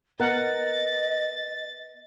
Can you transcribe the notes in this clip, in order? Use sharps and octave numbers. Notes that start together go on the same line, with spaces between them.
B3 A#4 D#5 F#5 A6